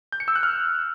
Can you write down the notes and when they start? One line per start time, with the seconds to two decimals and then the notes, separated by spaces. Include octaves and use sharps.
0.12 G6
0.20 C#7
0.28 E6
0.35 F#6
0.43 F6